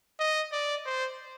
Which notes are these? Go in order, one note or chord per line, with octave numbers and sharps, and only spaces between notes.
D#5
D5
C5